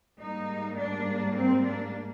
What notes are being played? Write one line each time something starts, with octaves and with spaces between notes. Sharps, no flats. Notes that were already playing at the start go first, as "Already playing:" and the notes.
G#2 G3 A#3 D#4
D4
C4
D4